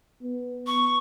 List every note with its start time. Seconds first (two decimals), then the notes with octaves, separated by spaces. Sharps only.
0.23 B3
0.67 C#6